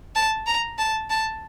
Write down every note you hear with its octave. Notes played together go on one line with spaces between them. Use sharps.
A5
A#5
A5
A5